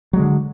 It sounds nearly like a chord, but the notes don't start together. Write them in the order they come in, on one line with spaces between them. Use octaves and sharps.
F#3 G#3 D3